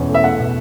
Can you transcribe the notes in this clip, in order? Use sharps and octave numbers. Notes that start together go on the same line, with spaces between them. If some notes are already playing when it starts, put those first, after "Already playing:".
Already playing: E2 B2 C#4
A3
E5
A3 F#5
B2